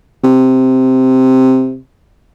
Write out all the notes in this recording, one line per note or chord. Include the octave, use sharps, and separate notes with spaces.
C3